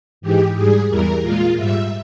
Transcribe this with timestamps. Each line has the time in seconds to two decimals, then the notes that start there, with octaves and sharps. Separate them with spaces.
0.21 G#2 E3 G#3 G4
0.55 G#2 G3 G#4
0.89 E2 E3 G3 A#4
1.22 A#2 G#3 F4
1.56 G#2 G3 E5